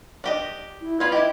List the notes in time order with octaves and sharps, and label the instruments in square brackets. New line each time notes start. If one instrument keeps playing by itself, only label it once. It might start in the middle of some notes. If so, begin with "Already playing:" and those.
[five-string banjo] D4 G4 D#5
[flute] E4
[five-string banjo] B3 F4 B5 [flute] G#6
[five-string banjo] E4 G4 [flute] D#5